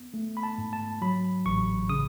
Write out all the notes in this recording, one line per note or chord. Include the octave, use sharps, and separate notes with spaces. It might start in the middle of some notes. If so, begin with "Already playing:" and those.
Already playing: B3
A3
B5
A5
G#2
A5
F#3 B5
A1 C#6
C#3 D#6